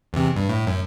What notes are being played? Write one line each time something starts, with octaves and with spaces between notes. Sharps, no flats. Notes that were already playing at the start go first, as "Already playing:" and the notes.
E2 C3
G2
A2
F#2